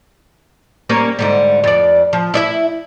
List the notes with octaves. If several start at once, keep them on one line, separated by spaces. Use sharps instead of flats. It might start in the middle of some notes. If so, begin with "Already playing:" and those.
G3 A#3 C#4
G#2 D3 G3
F2 D5
F3
E4 D5 E5